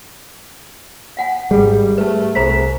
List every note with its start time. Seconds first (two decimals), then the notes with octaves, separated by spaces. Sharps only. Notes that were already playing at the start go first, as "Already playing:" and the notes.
1.17 F5 F#5 G#5
1.51 G#1 G3 G#4
1.98 A3 B4 A5
2.35 C2 G#4 C5 A#5 B6